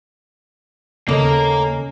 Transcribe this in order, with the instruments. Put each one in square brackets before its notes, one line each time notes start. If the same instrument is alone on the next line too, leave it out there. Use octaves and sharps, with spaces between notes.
[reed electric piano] D#2 A4 D#5 [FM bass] C#3 [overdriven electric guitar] A#3 A#4 [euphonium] C#4